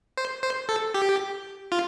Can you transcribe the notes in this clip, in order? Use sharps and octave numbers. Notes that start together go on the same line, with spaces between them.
C5
C5
A4
G4
F4